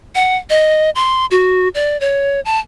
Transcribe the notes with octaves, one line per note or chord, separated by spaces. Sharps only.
F#5
D#5
C6
F#4
D5
C#5
A5